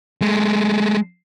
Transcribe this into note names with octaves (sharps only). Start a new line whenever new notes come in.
G#3 A3